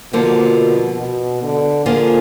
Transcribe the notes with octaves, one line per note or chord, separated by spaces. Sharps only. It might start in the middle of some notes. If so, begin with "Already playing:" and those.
B2 D3 F3 A#3
B2
D3
D3 F3 A#3 F4 G#4